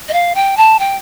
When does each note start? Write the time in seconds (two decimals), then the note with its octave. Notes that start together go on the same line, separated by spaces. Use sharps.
0.08 D#5
0.13 F5
0.35 G5
0.57 A5
0.79 G5